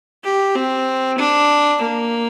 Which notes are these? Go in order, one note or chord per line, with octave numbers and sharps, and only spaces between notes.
G4
C4
D4
A#3